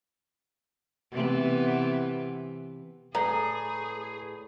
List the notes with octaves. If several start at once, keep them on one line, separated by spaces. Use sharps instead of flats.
C3 E3 B3
A2 G#4 B4 D5 A#5 B5